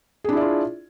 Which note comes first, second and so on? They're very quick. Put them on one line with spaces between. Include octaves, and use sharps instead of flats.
G#4 D4 E4 D5 F4